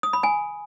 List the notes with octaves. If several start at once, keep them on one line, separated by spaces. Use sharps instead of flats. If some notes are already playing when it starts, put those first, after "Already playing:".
D#6
B5
G#5